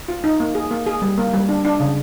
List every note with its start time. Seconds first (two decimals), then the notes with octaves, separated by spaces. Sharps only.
0.08 F4
0.24 D#4
0.40 A#3
0.55 G#4
0.71 A#3
0.86 G#4
1.02 G3
1.18 A#3
1.33 G3
1.49 D4
1.65 D4
1.80 C#3